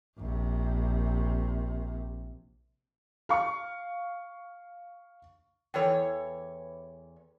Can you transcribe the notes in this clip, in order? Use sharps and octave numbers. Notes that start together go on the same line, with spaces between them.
A#1 C3
F5 C#6
E2 E3 A4 C#5 G5